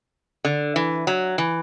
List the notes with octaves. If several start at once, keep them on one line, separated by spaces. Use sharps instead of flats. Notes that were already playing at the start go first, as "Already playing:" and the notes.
D3
E3
F#3
E3